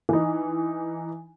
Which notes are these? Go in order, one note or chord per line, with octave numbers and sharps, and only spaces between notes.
E3 D#4